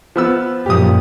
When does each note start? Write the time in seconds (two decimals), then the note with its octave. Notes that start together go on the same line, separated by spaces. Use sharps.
0.16 F3 B3 E6
0.66 F#2 A#2 F3 G4 D#6